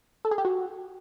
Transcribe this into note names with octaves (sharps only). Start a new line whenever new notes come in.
A4
G#4
G4
F#4